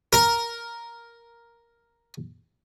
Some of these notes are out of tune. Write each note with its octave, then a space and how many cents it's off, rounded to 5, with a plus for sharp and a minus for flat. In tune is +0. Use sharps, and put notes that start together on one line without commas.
A#4 +5